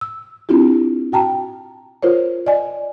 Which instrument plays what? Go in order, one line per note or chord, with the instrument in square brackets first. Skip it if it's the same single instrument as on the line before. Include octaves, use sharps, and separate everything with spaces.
[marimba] E6
C4 D4 E4 F4 G4
F#4 G5 A5 A#5
F4 A#4 C5 C#5
D5 D#5 G#5